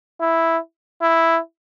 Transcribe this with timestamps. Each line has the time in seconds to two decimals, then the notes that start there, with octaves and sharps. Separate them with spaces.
0.21 E4
1.02 E4